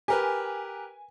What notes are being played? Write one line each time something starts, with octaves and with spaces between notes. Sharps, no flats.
G4 A#4 B4 G#5